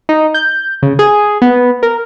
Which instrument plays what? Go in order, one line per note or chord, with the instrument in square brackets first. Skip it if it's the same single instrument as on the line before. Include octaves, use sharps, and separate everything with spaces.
[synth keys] D#4
G6
C#3
G#4
B3
A#4